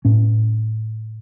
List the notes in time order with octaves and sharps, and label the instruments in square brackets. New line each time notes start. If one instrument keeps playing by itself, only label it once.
[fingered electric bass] A2 C#4